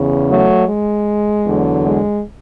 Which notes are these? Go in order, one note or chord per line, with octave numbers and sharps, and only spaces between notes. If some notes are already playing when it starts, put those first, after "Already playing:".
Already playing: E2 C#3
F#3 A3
G#3
E2 D3 F#3
G#3